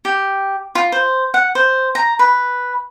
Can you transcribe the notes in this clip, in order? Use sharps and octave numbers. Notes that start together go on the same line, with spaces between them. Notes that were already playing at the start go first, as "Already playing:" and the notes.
G4
F4
C5
F#5
C5
A#5
B4